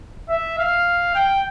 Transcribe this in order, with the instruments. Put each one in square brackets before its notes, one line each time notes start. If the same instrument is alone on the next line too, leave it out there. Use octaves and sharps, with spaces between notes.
[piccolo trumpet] E5
F5
G5